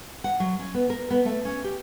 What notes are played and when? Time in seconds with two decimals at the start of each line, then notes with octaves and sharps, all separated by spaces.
0.24 F#5
0.40 F#3
0.59 C#4
0.74 B3
0.90 A#4
1.10 B3
1.25 A3
1.45 C#4
1.64 G4